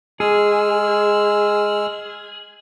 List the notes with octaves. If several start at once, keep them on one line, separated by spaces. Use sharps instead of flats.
G#3 G#4 E6 F6